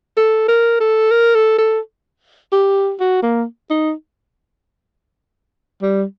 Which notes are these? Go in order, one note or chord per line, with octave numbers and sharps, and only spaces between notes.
A4
A#4
A4
A#4
A4
A4
G4
F#4
A#3
D#4
G3